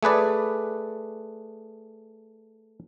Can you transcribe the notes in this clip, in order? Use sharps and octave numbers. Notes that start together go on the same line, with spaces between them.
A3 G#4 B4 D5